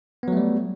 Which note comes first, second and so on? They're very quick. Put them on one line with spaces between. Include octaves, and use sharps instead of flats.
B3 F#3 A3 G3